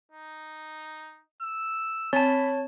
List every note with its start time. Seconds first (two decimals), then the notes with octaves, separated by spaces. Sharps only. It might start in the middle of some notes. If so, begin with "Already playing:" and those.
0.12 D#4
1.42 E6
2.13 C4 C#5 A5 B5